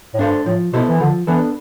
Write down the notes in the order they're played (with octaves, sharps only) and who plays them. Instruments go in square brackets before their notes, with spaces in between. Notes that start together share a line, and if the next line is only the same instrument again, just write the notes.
[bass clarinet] A2
[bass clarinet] G2 [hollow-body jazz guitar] D4 A4 C5
[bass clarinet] A2 [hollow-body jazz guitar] F3
[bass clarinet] B2 [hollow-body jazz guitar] B3 E4 A4 C5
[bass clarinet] E3
[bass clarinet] D3 [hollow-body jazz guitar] F3
[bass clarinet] E3 [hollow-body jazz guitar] B3 D4 A4